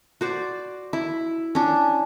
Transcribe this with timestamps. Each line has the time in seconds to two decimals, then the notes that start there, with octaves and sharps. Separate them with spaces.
0.21 F#4 C5 D5
0.93 E4
1.55 C#4 D4